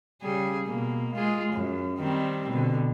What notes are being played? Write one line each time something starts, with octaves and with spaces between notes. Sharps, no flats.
C#3 G3 G#4
B2 A#3
G#3 F4 G#4
F#2
D#3 G3 C4
B2 D3